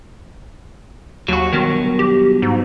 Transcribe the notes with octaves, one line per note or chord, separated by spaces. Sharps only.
D#2 F#3 F#4
G2 B2 D#3 F#3
G4
G#2